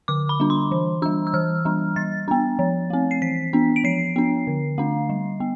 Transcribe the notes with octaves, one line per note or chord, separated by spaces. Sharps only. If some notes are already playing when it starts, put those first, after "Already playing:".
D3 D6
B5
G3 D4
C6
E3
G3 D4 E6
E6
E3 F6
G3 D4
G3 A6
B3 D4
F3
A3 C4
C7
E3 B6
B3 D4
D7
F3 C7
B3 D4
D3
A3 D4
G3
B3